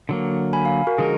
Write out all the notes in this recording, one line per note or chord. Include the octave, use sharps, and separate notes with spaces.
D3 F#3 A#3
G#5 B5
F5 G#5
F#4 A#4
D3 F3 G#3 D#4 G#4 A#4